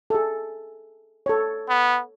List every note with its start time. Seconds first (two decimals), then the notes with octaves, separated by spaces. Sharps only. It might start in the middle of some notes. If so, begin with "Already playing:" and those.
0.10 G#4 A4
1.26 A4 C#5
1.69 B3